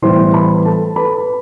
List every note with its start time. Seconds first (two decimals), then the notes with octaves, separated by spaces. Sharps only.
0.02 A2 E3 G3 B3 E4 C5 C6
0.33 B4 B5
0.65 A4 A5
0.96 B4 B5